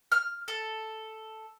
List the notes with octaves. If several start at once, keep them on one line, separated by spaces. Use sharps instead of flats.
F6
A4